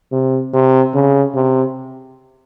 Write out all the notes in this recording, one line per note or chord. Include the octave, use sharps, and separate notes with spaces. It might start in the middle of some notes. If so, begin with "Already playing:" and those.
C3
C3
C#3
C3